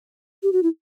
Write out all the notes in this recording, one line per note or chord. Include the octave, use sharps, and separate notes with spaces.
G4
F#4
E4